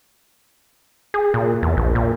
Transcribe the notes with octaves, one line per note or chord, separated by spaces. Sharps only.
G#4
A#2
E2
A#1
A#2